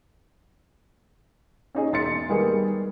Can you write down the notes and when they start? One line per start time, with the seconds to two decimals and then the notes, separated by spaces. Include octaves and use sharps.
1.75 C#4 D#4 G#4
1.92 E1 C6 A6 C#7
2.29 D#3 G3 G#3 A#3 B3 G#4